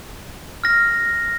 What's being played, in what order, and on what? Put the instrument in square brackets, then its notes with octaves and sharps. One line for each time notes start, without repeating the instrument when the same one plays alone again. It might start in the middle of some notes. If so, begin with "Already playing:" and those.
[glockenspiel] F6 A#6